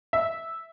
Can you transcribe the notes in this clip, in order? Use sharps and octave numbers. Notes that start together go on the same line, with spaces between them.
E5